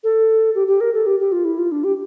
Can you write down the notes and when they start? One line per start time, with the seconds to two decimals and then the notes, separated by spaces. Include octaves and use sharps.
0.03 A4
0.55 G4
0.67 G4
0.80 A#4
0.94 A4
1.06 G4
1.20 G4
1.32 F4
1.45 E4
1.58 F4
1.72 D4
1.84 G4